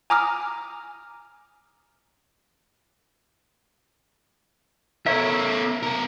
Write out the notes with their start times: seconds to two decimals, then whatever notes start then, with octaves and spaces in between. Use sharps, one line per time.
0.10 G#5 A#5 D6 D#6 F6
5.06 B3 A4 A#4 C#5 E5
5.83 B3 A#4